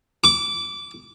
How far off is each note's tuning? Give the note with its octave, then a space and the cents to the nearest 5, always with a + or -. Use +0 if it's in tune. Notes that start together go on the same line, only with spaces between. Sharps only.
D6 -20